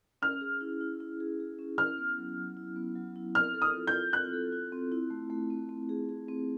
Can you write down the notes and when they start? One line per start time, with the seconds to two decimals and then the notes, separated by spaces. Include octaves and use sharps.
0.22 C#4 F6
0.41 G#4
0.61 E4
0.81 E4
1.00 E4
1.20 G#4
1.40 G#4
1.59 C#4
1.78 E4 F6
1.98 B3
2.18 F#3
2.38 F#3
2.57 E4
2.76 B3
2.96 F#3
3.16 E4
3.35 C4 F6
3.54 A4
3.62 D#6
3.74 F4
3.87 G6
3.93 F4
4.13 C4 F#6
4.33 A4
4.52 F4
4.72 C4
4.92 E4
5.10 A3
5.30 A3
5.50 C4
5.69 C4
5.89 G#4
6.09 G#4
6.28 C4